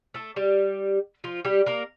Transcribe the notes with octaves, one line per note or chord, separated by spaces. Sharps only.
A3 A4
G3 G4
F3 F4
G3 G4
A#3 A#4